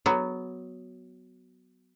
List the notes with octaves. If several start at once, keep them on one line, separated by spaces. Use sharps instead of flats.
F#3 B3